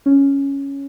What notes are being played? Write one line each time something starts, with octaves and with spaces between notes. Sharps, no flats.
C#4